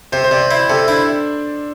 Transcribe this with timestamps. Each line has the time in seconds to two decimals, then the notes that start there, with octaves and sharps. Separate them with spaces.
0.12 C3 C5
0.24 C5
0.31 C3 D5
0.50 E4 C5
0.69 C3 A4
0.88 D4 E4